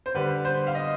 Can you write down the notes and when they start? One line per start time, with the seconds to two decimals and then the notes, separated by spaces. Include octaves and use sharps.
0.06 C5
0.14 D3 G3 B4
0.45 C5
0.67 F5
0.75 D#5